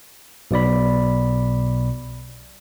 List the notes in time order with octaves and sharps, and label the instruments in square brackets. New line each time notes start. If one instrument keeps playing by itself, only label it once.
[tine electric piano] B1 B2 D5 B5